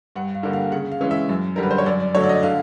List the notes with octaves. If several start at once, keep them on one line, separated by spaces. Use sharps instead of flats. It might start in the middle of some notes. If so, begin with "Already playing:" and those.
G2 F#5
F5
D3 G3 A#3
F5
C#3 F#5
F5
E3 G#3 C#4
E5
F#2
D3 G3 A#4
B4
C5
C#5
F#2 D5
D5
D3 F#3 A3 C#5
D5
D#5
D3 F5